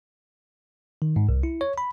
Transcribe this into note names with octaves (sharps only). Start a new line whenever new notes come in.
D#3
G#2
C2
E4
C#5
B5